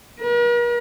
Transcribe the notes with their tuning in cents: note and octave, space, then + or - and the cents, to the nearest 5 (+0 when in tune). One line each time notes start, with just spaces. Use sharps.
A#4 +45